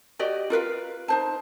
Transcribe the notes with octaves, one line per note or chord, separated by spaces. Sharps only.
F#4 G4 D5 D#5
F4 A#4 B4 F5
D#4 C5 A5